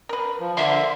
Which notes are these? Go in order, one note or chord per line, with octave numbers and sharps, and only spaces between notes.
A#4 B4
F3
D3 A#3 E5 C6